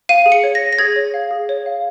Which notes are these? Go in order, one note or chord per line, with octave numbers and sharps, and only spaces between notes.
F5 D#7
G#4
C#7
C#5
A#6
C#5
A#6
G#4 G#6
C#5
F5
G#4
C#5
F5